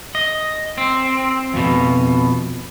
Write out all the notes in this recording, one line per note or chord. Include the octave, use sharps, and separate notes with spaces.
D#5
C4
F2 B2